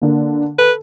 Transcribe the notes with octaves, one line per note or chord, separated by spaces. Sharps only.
D3 A#3
A4 B4